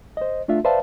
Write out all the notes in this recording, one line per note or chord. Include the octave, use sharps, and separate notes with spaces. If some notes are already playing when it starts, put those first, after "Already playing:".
C5 D#5
A3 D4 F4 E5
B4 C5 D5 E5 F5 A5